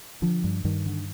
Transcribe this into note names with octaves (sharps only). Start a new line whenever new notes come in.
D3 F3
G2
G2 D#3
D3